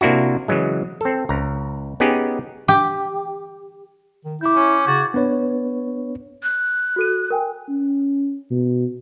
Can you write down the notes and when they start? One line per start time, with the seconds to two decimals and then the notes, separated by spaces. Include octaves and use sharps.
0.01 C3 A#3 D4 E4 F#4
0.48 C#3 E3 F#3 G#3
1.01 C4 A4
1.29 C#2 A#5
2.00 B3 C#4 D#4 G4 G#4
2.68 G4
4.25 D#3
4.41 E4 D6 G6
4.56 C#4
4.87 C#3 F#4 G#6 A6
5.14 B3 D4 B4 C#5
6.43 F#6
6.96 F#4 A4 D#7
7.30 A#4 G5 G#5
7.69 C#4
8.51 B2